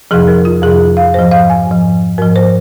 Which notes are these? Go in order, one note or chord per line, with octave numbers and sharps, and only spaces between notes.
F2 C3 F3 G#4
A#4
F4
F2 C3 F3 G#4
F5
G#2 F3 C5
F5
G#5
G#2 F3
G#2 F3 A#4
C5